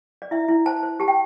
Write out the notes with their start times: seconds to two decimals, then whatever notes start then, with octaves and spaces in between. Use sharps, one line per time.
0.22 D5
0.31 E4 E5
0.48 E4
0.66 C5 A5
0.83 C5
1.00 G4 A5
1.08 G5